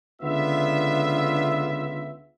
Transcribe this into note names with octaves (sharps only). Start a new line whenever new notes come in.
C#2 D3 B3 F4 E5